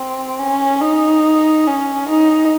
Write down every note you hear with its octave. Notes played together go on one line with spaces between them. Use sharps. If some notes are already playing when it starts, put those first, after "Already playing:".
Already playing: C4
C#4
D#4
C#4
D#4